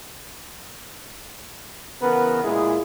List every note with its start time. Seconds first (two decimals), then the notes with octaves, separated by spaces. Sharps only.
2.02 C#3 E3 B3 A#4 B4
2.44 A#2 G#3 E4 G#4